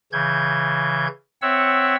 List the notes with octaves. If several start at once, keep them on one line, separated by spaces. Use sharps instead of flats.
C#3 E3 G6 G#6
C4 C#5 E5 F#5 E6